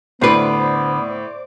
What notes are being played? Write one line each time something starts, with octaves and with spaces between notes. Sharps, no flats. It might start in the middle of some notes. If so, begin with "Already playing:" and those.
D2 A2 B3 B4 C5 D5 D6 C7